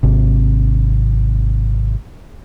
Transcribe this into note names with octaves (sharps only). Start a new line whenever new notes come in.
G#1 C3